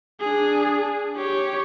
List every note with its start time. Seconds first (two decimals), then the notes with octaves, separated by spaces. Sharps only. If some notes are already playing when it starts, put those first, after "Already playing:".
0.20 D4 G#4
1.17 G4 C#5